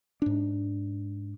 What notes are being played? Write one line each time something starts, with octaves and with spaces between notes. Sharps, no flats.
G#2 D4